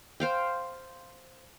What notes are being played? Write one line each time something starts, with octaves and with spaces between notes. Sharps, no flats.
C5 F5 G5